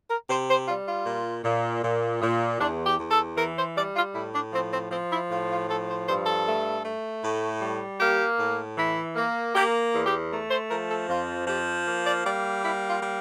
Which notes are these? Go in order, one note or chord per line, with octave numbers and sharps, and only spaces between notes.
A#4
C3 C5
C5
G3 F4
F4
A#2
A#2
A#2
A#2
E2 D4
G4
E2
A4
E3 A#4
C5
G3 D5
F4
A2 E4
D4
F3 C4
C4
F3 C4
E4
A2 F4
F4
F3 A4
C5
G2 C5
A4
A3
A3
A2
G3
A#3 G4
A2
E3 E4
A#3
A#3 G4
E2
G4
A3 A#4
C5
F3 A#4
A4
F2 F4
F3 G4
A#3
D5
G3 D5
A#3 E4
F4
G3